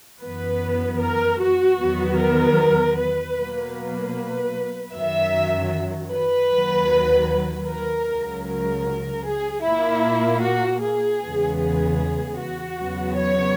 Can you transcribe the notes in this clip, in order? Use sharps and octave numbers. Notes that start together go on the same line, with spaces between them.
F#2 E3 B3 B4
A#4
F#4
E2 D#3 F#3 B3
A#4
B4
B2 F#3 A#3
B4
F#2 D#3 F#3 E5
B4
D#2 D#3 F#3
A#4
C#2 C#3 F#3
A#4
G#4
A#2 A#3 E4
F#4
G#4
E2 C#3 E3 G#3 B3
G#4
F#4
E2 C#3 F#3 B3
C#5